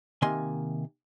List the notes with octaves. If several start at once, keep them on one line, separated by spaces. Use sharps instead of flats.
C3 D#3 A#3 G#5 C6